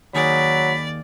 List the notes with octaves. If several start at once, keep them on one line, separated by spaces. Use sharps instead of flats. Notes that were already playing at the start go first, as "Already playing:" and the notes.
D#2 D#3 F#3 G#4 D5 B5